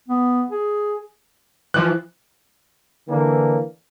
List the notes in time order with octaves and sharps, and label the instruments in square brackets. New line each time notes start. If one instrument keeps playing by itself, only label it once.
[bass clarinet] B3
G#4
[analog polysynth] E3 F3 [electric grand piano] F#6
[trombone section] D3 E3 A#3 D4